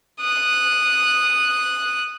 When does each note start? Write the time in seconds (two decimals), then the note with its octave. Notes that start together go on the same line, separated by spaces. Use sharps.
0.20 D#6 F#6